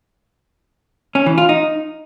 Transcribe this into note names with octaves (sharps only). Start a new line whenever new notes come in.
C#4
E3
F4
D#4